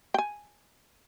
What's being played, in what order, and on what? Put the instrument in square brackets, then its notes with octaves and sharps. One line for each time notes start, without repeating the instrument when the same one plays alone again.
[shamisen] G5 G#5